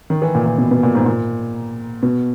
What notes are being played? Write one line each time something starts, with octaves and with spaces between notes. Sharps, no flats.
D#3
E3
A#2
A#2
B2
B2
A#2
G#2
A#2
B2